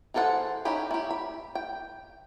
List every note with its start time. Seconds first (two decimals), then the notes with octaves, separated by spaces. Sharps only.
0.14 E3 G#4 A4 C5 F#5
0.65 C#4 D#4 E4 G4 B5
0.91 E4 G4
1.11 B5
1.55 G5